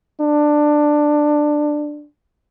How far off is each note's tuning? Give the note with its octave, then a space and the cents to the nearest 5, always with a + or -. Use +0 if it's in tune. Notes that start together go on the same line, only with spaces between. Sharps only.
D4 +15